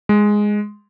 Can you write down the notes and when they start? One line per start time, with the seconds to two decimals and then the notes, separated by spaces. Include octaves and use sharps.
0.09 G#3